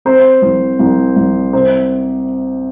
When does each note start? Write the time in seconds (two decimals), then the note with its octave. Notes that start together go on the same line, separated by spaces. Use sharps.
0.05 C4 C5
0.42 C2
0.79 C2
1.16 C2
1.53 C3 C5